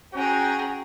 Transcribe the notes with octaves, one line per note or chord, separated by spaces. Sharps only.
C#4 F#4 G#4 G5 A#5